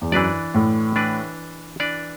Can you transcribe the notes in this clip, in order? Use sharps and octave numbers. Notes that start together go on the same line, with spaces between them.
E2
F#2 E3 D4 B4 D5
A2
E3 D4 B4 D5
E3 D4 B4 D5